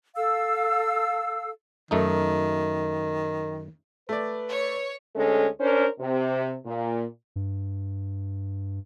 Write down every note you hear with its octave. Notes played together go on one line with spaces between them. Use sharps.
A4 F5 E6
F#2 D#3 A3 D#4
A3 B4 D5
C#5
D2 G#3 C#4 A4
C#4 D4 A#4 C5 C#5
C3
A#2
G2